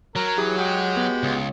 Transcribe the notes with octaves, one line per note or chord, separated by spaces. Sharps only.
F#3 A#4 A#5
E3 G4 G#4
G#3 F#4 G4 F#5 G5 D#6
B3
C#2